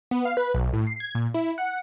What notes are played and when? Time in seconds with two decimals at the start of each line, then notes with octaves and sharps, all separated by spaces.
0.11 B3
0.25 F5
0.37 B4
0.54 B1
0.73 A2
0.87 C7
1.00 G#6
1.15 A#2
1.34 E4
1.58 F#5